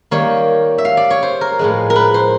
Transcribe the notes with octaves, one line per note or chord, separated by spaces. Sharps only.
D#3 G3 A#3 C#5
E5
F5
D5
C#5
C5
A#4
A2 F3 G#3
A#4
B4
C5